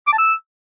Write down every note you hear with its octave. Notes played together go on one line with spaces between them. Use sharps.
D6
A5
E6